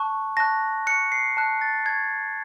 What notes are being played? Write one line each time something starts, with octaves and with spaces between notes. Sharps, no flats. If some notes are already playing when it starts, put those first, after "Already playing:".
Already playing: A5 C#6 F#6
A5 C#6 F#6 A#6
A5 C#6 F#6 C#7
C7
A5 C#6 F#6
A6
A5 C#6 F#6 G#6